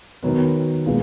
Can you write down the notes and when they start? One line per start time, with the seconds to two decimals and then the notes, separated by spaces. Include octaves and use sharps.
0.23 D#3 F#3 B3
0.86 A#2 G#3 B3 E4